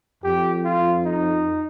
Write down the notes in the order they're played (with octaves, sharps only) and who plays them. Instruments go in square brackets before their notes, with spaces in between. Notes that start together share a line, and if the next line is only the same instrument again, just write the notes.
[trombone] F2 [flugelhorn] G4
[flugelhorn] F4
D#4